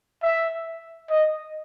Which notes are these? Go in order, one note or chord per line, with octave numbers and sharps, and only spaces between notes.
E5
D#5